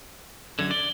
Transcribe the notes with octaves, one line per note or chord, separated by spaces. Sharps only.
F#2 D3 G#6
D5 G7